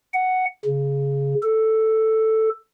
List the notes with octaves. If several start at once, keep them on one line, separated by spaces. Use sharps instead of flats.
F#5
C#3
A4